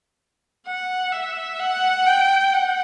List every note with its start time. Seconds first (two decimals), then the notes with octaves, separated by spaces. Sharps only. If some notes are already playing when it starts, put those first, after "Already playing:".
0.66 F#5
1.12 E5
1.60 F#5
2.06 G5
2.53 F#5